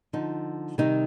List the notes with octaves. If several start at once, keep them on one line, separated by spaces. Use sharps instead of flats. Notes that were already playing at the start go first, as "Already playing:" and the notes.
D3 F3 D#4
C3 D#3 G3 D#4